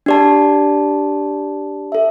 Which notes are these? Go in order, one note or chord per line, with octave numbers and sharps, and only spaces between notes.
D4 G4 D5 A5
A4 E5